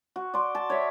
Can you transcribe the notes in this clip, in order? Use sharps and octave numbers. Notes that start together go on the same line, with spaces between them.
F#4
D5 C6
A5
C#5 D5 E5